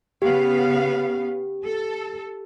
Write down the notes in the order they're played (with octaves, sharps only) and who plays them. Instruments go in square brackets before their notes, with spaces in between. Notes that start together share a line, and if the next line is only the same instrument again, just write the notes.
[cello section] C#3 B3 F5 [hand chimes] G4
[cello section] A4